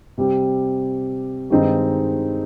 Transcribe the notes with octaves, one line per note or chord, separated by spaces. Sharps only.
C3 G3 C4 G4
G2 D#3 G#3 C4 D#4